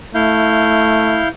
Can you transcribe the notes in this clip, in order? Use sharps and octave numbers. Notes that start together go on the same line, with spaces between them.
A3 E4 F5 G6